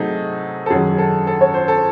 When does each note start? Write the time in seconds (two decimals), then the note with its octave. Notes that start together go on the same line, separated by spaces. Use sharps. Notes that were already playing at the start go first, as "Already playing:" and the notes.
Already playing: C3 F#3 A3 D#4 G#4
0.66 A4
0.70 F#2 D#3 F#3 C#4 G#4
0.98 A4
1.27 A4
1.41 C#5
1.54 C5
1.68 A4